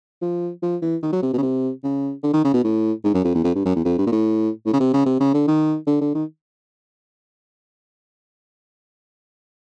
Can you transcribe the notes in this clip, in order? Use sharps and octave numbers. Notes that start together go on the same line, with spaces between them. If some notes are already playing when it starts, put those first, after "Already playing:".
F3
F3
E3
D#3
F#3
C3
B2
C#3
C3
C#3
D3
D#3
C#3
B2
A2
G#2
F#2
F2
E2
F2
G2
F#2
E2
F2
G2
A#2
A2
A2
C#3
C3
C#3
C3
C#3
D3
D#3
D3
D3
D#3